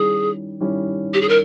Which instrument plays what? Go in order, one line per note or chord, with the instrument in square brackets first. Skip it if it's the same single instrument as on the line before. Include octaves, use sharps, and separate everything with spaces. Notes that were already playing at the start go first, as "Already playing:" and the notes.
Already playing: [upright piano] D#3 G3 C#4 E4 [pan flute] G#4
[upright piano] D#3 G3 C#4 E4
[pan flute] G4
G#4
A#4